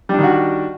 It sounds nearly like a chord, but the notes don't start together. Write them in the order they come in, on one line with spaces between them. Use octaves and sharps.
G3 D4 D#3 F#4